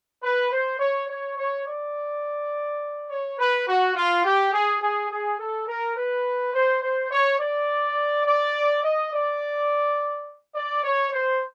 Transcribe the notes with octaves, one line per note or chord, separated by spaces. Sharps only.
B4
C5
C#5
C#5
C#5
D5
C#5
B4
F#4
F4
G4
G#4
G#4
G#4
A4
A#4
B4
C5
C5
C#5
D5
D5
D#5
D5
D5
C#5
C5